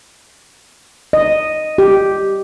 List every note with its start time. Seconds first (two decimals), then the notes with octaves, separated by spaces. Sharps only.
1.13 D#5
1.78 G4